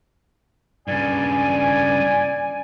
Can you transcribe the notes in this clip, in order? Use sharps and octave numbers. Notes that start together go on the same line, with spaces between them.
G2 C#3 D5 G#5